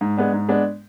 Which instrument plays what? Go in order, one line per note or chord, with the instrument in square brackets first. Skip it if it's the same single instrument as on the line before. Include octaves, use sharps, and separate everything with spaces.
[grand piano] G#2
G#3 B3 D4
G#2
G#3 B3 D4